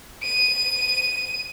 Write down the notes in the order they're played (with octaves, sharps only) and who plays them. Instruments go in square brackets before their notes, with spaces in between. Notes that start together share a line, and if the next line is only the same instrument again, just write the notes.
[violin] D#7